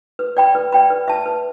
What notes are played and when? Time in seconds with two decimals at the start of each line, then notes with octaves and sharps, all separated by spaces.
0.19 B4
0.37 D5 G5 B5
0.55 B4
0.72 D5 G5 B5
0.90 B4
1.08 E5 A5
1.26 B4